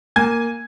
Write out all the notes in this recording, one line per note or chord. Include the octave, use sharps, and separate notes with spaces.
A#3 G#5 G#6